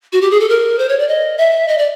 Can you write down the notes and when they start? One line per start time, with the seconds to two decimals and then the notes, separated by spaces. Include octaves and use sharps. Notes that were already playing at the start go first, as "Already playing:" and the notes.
0.13 F#4
0.21 G4
0.31 G#4
0.40 A4
0.49 A#4
0.79 C5
0.89 C#5
0.99 D5
1.08 D#5
1.38 E5
1.68 D#5
1.78 D5